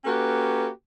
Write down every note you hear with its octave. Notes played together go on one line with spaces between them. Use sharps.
A#3 C#4 F#4 G4 A4 B4